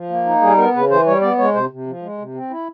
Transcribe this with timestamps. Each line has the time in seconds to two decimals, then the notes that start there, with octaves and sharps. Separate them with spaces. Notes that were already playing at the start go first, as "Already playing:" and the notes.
Already playing: F3
0.10 A#3
0.25 D#4
0.42 G3 G#4
0.57 B3 A#4
0.74 C#3 B4
0.90 E3 C5
1.06 G3 C#5
1.21 B3 D5
1.38 G#3 C#5
1.54 C3 C5
1.71 C3
1.87 F3
2.02 G#3
2.18 C3
2.35 C4
2.50 E4